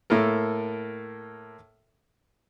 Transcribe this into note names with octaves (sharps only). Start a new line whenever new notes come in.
A2 A#3 A4 A#4